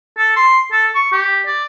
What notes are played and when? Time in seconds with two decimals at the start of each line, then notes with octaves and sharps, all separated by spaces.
0.18 A4
0.37 C6
0.72 A4
0.95 C#6
1.12 G4
1.46 D5